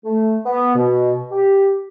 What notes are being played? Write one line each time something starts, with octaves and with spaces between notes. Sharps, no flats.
A3
B3
B2
G4